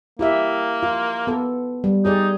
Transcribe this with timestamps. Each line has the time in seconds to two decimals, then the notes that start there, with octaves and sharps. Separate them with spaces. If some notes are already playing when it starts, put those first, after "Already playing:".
0.19 A#3 E4 G4 E5
0.83 F4
1.27 B3 A4
1.84 G3
2.05 D#4 G4 G#4 D5